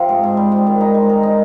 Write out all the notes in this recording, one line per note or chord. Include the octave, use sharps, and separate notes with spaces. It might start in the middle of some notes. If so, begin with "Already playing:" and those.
Already playing: C3 F3 C4
G#2
G#2
G3
G#2
D#3
D#4
G#3
A#4
D#4